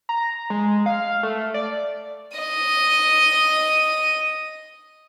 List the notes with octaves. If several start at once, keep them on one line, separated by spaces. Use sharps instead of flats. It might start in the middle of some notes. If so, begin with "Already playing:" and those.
A#5
G#3
F5
A3
D5
D#5 D#7